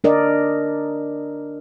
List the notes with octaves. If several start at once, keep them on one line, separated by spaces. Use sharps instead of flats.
D4 A#4 D5 D#5